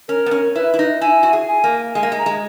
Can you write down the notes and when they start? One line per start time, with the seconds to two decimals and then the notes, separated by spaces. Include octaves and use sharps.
0.08 C#4 A#4
0.26 B3
0.31 C#4
0.55 E4 B4
0.74 E4
0.79 D#4
1.01 E4 G#5
1.23 F#4
1.33 G#4
1.48 G#5
1.64 A#3
1.95 G#3 G#5
2.03 A#3
2.12 G#3
2.18 A#5
2.26 G#3